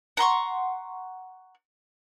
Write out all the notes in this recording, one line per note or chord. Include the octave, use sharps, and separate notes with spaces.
F#5 A#5 C6 C#6